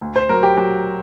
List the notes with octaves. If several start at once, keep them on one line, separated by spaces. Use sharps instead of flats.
D2
C5
F#3 A#4
G4
F#3 G4